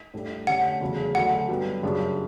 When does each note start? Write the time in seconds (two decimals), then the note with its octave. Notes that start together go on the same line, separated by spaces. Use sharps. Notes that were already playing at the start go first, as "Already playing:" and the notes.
0.14 A2 G3 D4 A4
0.47 D3 A3 C#4 G4 F#5
0.81 E2 C#3 F#3 A3
1.15 D2 D3 F#3 A3 F#5
1.48 G2 F#3 B3
1.82 F#2 C#3 G3 D4